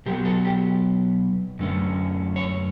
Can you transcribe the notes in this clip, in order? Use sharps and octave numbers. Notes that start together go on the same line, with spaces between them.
B2 F#3 B3 G4
A4
G4
F#2 D3 A3 C#4
C#5